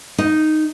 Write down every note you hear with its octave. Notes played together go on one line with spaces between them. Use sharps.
D#4